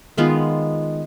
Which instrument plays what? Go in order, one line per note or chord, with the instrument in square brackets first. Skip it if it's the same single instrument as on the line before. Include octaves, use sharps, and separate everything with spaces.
[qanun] D#3 G#3 B3 F4